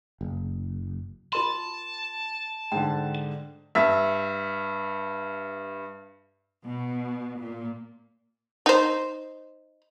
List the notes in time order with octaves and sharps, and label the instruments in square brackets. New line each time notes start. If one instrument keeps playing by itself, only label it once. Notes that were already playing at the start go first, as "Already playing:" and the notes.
[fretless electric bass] F#1
[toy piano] F4 A#4 C6 [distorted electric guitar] A5
[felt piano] G#2 D3 [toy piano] G5
[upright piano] G2 E5
[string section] B2
A#2
[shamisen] D#4 C5